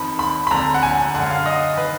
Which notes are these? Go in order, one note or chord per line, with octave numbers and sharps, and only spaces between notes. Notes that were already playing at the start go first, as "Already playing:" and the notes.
Already playing: F2 D#3 B5
B5
B5
F2 D3 A#5
F#5
G#5
F#2 D3 F#5
F5
D#5
D#3 B4